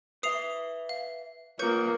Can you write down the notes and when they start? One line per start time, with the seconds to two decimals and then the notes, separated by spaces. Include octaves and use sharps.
0.23 B4 E5 D#6 C7 F7
0.89 F5
1.59 A#3 F4 B4 C#5 G6 C#7